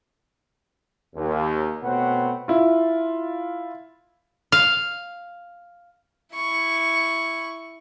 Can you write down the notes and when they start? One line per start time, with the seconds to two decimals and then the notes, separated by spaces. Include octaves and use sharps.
1.16 D#2
1.83 B2 A3 C4 B4 C#5 F#5
2.48 E4 F4
4.52 F5
6.35 E4 C#6